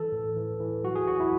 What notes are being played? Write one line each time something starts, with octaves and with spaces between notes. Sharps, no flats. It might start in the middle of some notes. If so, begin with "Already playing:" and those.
Already playing: E3 A4
A2
E3
E3
F#3 F#4
G#4
F#3 F#4
E4